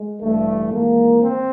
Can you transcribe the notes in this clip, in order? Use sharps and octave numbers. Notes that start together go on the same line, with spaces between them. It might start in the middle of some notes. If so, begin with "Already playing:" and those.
Already playing: G#3
A1 G2 E3 A3
G#1 G#2 E3 A#3
C4